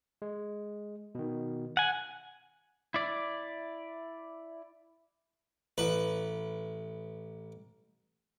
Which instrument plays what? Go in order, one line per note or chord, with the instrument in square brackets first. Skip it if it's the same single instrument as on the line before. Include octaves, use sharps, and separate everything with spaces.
[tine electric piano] G#3
B2 D#3
[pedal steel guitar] F#5 G#5
[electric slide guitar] E4 D5
[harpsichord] A1 B4